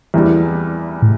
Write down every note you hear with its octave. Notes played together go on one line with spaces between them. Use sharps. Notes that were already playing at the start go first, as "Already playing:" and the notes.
E2 E3 G3
A2